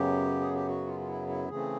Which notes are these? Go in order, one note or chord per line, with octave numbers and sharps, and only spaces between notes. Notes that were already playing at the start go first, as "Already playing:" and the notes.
Already playing: F#2 C#3 F#3 B3 G4
G#4
G4
F#4
F4
F4
E4
E4
C#3 E3 A3 C4 G#4